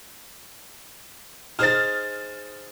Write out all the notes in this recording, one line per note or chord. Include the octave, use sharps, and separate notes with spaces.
D#4 G#4 C5 F6 A6